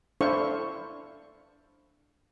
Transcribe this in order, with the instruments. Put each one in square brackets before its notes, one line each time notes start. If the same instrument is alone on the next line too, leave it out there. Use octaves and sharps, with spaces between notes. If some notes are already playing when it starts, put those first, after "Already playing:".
[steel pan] D4 E4 A4 C5 F5 C#6